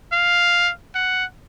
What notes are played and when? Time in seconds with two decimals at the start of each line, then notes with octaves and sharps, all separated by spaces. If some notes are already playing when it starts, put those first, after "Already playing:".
0.13 F5
0.95 F#5